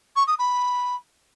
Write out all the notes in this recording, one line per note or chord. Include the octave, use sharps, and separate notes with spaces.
C#6
D#6
B5